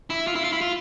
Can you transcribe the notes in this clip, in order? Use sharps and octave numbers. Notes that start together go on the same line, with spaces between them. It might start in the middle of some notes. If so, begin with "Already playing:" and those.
E4
F4
E4
F4
E4
F4